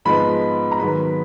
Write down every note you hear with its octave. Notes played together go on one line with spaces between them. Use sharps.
G#2 F3 G#3 B3 B5
A#5
G#2 D#3 F#3 B3 B5